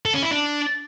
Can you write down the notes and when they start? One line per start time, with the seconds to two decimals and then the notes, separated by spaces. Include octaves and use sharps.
0.06 A4
0.14 C#4
0.23 E4
0.31 D4